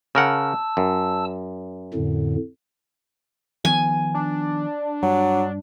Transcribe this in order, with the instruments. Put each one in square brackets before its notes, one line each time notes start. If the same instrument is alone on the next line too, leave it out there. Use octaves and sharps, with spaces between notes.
[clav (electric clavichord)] C#3 A#4 F#5 [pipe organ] A5 E6
[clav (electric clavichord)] F#2
[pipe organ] F2 A2 D3
[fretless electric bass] D#3 F3 B3 [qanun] G#5
[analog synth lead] D4
[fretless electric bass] G2 [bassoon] F#3